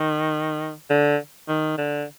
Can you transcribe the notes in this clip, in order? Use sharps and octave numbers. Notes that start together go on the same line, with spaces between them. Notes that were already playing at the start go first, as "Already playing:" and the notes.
Already playing: D#3
D3
D#3
D3